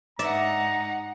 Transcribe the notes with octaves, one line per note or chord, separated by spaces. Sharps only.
G#2 D#4 D5 E5 F#5 A#5